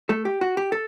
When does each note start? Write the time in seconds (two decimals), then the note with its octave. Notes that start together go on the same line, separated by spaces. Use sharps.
0.09 A3 A4
0.25 G4
0.41 F#4
0.57 G4
0.72 A4